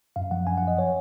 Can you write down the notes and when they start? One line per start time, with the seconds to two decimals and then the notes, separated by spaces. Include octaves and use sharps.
0.16 F#2 F5
0.31 F3 F#5
0.47 F#2 G#5
0.58 F#5
0.63 F#2 D#5
0.78 C#5